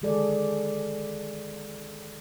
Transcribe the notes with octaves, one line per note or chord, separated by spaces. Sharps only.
D3 D#3 G#3 G#4 A4 D5